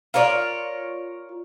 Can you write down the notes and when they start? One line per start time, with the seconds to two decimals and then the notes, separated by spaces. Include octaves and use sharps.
0.14 F4 A#4 C#5 D5